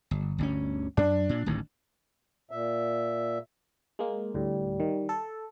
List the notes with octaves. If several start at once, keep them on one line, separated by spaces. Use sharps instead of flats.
G1
G1 D2 C#4
F#2 D4
A#2
D1 A1 D#3
A#2 E5
G#3 A#3
D2 A2 G3
D#3
A4